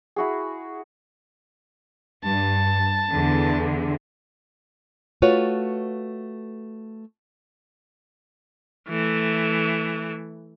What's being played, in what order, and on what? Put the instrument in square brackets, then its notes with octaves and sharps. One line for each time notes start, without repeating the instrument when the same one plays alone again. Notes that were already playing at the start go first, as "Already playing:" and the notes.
[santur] E4 F#4 G#4
[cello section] G2 [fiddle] A5
[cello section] E2 D3
[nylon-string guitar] A3 F4 F#4 B4 C#5
[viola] E3 A3